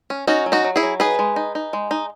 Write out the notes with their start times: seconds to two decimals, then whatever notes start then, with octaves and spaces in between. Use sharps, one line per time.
0.10 C#4
0.27 C#4 D#4 F#4
0.46 F#3
0.52 D#4 F#4
0.64 F#3
0.76 E4 G#4
0.83 F#3
1.00 D#4 G#4 B4
1.19 G#3
1.36 D#4
1.55 D#4
1.73 G#3
1.91 D#4